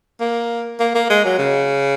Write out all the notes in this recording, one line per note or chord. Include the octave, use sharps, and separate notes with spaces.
A#3
A#3
A#3
G#3
F#3
C#3